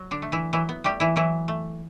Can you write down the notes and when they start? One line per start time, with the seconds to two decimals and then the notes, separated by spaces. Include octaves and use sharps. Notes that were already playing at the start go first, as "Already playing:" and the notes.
Already playing: F#3
0.11 D3 D4
0.22 A3
0.32 E3 E4
0.53 E3 F#3 E4
0.69 B3
0.84 G3 A3 G4
1.00 E3 E4
1.16 E3 F#3 E4
1.48 A3